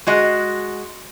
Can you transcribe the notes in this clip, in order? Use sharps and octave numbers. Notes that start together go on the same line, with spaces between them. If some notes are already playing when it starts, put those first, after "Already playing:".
G#3 F#4 D#5